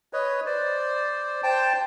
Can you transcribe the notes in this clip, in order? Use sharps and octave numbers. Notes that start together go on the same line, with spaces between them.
B4 C#5 D#5
C5 D5
C5 G5 A5